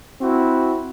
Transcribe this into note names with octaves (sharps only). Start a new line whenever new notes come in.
C4 E4 F#4